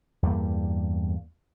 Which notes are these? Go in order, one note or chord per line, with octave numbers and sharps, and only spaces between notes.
E2 G2 G3 A#3